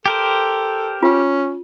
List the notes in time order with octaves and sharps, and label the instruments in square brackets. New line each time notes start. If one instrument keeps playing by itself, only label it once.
[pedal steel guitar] G4 A#4 C5 [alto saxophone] A4
[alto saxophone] C#4 [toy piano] F4